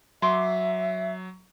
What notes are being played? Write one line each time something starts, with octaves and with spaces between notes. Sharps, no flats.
F#3 E5 C6 D6